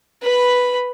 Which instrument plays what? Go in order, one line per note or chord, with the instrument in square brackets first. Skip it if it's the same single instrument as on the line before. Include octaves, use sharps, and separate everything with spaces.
[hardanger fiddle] B4 B5